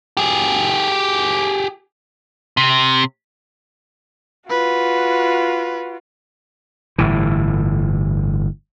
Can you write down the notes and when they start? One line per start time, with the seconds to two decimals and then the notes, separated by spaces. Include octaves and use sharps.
0.17 G4 G#4
2.57 C3
4.50 F4 F#4 B4
6.98 G1 A2 E3